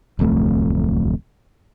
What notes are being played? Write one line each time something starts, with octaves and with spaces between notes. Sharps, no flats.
D1 C2 F2 A3